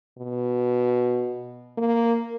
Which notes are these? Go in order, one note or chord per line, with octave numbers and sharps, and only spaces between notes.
B2
A#3